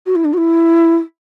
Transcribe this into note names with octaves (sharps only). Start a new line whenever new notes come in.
F#4
E4
D4
F#4
E4